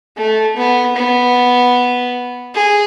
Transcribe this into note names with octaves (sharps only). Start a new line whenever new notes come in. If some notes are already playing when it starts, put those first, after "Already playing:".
A3
B3
B3
G#4